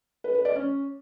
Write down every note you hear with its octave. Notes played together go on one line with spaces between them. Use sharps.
B4
B4
D5
C#4